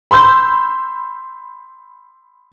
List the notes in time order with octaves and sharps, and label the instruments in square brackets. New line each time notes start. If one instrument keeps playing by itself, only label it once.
[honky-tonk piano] B5 C6 E6 G6